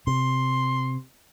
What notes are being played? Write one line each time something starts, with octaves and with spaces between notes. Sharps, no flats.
C3 C6